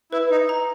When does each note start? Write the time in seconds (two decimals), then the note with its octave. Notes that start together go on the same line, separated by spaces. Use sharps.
0.12 E4 B4
0.31 D#4
0.49 A#5